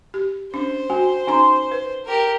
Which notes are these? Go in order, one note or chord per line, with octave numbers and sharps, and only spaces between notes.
G4
C#4 D4 C5
C#4 F#4 G#5
C#4 D#4 G#5 A#5 C6
B4
G4 A#4